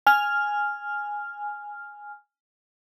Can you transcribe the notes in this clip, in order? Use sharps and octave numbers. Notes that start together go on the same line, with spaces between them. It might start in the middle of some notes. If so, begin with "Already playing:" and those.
G#5 F6